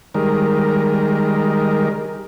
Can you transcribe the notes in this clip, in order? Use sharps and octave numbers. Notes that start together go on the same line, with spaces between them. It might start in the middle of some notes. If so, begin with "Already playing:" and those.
D#3 G3 G#3 A#4